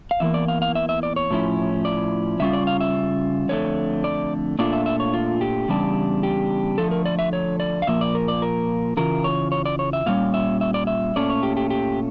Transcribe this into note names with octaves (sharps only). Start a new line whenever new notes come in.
F5
E2 E3 A#3 E5
D5
F5
F5
E5
E5
D5
C#5
A2 F3 C#4 E4
D5
C#3 G3 C#4 F4 E5
D5
F5
E5
F2 D3 A3 C#5
D5
A#2 A3 D4 F4 D5
E5
E5
C#5
F4
G4
E2 C#3 G3 D4
G4
D3 F3 A3 A4
A#4
D5
E5
C#5
D5
F5
A#2 F3 A#3 E5
D5
A#4
D5
A#4
C#3 E3 F4 A#4
C#5
C#5
D5
C#5
E5
A#2 G3 C#4 F5
E5
E5
D5
E5
A#2 A3 C#4 D5
C#5
G4
G4
G4